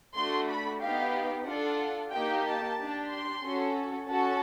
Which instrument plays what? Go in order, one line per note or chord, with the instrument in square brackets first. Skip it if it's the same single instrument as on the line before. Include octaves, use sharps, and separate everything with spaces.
[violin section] A3 D4 F#4 C6
B5
B3 D#4 G4 F5
D4 F4 A4 F#5
A#3 D#4 G4 G5
A5
D4 G4
C6
C#4 F#4 A4
C#4 F#4 A4 A5